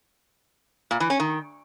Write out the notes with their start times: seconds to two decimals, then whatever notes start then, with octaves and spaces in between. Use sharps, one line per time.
0.91 A#2
1.00 E3
1.10 C#4
1.20 D#3